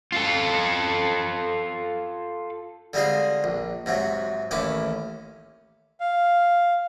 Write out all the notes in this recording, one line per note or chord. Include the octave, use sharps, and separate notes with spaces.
F4 A4
D3 G3 G#3 C4 F4 G#4
A#1
G#2 C3 F#3
A1 D#2 C#4 E4 D6
F5